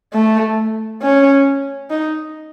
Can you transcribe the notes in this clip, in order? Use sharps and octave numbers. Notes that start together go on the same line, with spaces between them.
A3
C#4
D#4